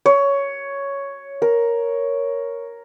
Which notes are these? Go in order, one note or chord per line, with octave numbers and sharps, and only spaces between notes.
C#5
A#4